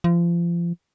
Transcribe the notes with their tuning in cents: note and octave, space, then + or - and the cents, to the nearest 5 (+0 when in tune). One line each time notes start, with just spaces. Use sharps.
F3 -30